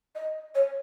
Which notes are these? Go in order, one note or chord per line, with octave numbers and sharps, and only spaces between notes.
D#5
C#5